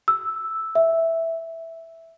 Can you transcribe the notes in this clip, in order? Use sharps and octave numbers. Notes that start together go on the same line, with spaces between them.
E6
E5